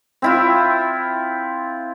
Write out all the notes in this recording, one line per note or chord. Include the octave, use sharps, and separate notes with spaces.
C4 E4 F4